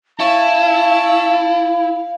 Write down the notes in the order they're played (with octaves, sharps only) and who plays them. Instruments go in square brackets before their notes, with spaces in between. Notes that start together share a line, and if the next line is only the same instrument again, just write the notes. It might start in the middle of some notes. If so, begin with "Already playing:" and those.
[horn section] C#4 C#5 A5 [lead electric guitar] E4 [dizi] F5